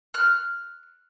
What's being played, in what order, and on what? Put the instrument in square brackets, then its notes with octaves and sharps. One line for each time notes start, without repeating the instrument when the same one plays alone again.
[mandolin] F6 F#6